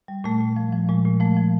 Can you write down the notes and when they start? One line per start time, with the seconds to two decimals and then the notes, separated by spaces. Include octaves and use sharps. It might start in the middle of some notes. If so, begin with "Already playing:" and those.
0.08 G3
0.24 A#2 A3
0.41 A#2
0.57 F3
0.72 F3
0.89 A#2 G#3
1.05 A#2
1.20 F3 A3
1.37 F3